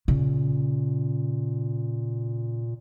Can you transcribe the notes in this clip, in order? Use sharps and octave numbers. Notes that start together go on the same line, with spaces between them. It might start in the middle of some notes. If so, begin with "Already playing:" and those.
A#2 C#3